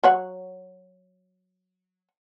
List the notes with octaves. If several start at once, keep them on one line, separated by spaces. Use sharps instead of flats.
F#3 C#5 F#5